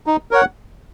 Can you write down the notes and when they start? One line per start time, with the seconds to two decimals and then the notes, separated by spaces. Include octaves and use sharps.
0.07 D#4
0.31 A#4 C#5 F#5